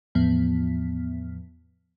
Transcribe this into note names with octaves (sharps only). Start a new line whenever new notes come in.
E2 A2 F3 B3